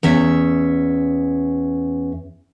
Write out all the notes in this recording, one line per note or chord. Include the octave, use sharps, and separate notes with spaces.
E2 C#4 E5